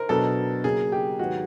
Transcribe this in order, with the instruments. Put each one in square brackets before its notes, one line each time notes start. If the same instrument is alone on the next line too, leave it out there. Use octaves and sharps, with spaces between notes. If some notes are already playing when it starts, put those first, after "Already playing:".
Already playing: [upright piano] A#4 C5
[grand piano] B2 F#3 B3 D4 [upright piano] A4
[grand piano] C#3 F#3 A#3 [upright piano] G#4
[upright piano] G4
[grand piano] G#2 D#3 F#3 B3 [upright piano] F#4